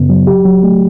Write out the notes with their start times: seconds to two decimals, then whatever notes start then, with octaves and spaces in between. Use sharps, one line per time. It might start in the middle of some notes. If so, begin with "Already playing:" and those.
Already playing: F#2 C#3 B3
0.10 F#3
0.27 G4
0.45 F#3
0.63 A3